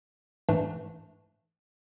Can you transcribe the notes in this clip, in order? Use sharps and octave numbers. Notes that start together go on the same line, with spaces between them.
G#2 E3 A3 D4